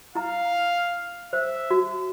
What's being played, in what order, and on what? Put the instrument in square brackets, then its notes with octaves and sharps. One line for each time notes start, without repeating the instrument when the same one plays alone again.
[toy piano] E4 A#5 [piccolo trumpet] F5
[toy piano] C5 [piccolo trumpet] E5
[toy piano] F#4